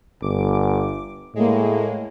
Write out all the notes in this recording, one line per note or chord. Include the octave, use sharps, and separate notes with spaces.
G1 D6
A2 G#3 A#3